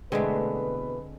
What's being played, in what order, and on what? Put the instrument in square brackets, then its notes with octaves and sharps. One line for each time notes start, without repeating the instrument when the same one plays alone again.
[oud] E2 B2 A3 [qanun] D3 [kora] G#3 C4 [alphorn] B4